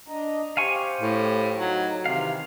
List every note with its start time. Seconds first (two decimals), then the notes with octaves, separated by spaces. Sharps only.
0.08 D4 D#5 A#5
0.57 G4 C5 F5 G#5 C#6
1.01 A2
1.57 F#3 D#4
2.06 C3 D#3 E3 F5